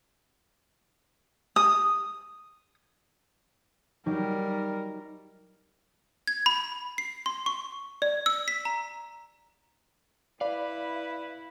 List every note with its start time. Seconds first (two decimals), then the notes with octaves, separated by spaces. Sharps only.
1.56 D#6
4.06 F#3 G3 D#4 G4 A#4
6.27 G#6
6.46 B5
6.98 C7
7.26 C6
7.46 C#6
8.02 D5
8.26 E6
8.48 B6
8.65 A#5
10.41 E4 B4 D5 F5